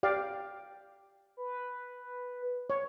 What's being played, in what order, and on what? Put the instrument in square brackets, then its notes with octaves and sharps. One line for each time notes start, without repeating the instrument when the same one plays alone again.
[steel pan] G4 D5 F5
[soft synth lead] B4
[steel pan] C#5